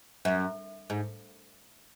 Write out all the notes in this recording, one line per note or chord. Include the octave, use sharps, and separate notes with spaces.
F#2
G#2